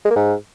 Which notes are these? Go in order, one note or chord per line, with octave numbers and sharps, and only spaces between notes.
G#3
A#3
G#2